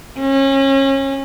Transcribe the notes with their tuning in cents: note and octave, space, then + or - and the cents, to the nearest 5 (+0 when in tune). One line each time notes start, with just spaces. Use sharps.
C#4 -30